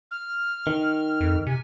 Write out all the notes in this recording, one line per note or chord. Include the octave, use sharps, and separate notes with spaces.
F6
D#3
F2
C3 G#5